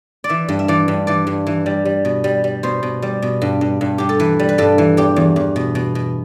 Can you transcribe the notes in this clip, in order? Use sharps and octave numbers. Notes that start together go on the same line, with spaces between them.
D5
E3 E5
G2
E5
E3 D5
G2
E3 D5
G2
E3
G3
G3
B2
G3
G3
B2 C5
B2
G3
B2
G2
G2
G2
G2 G4
A4
E3 B4
G3
B4
G2 A4
E3
E2 G4
E2
E2
B2
B2
B2